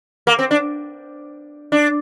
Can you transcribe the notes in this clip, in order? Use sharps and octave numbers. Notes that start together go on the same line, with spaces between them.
A#3
C4
D4
D4